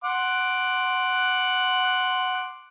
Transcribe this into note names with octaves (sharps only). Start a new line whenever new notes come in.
F#5 C6 D6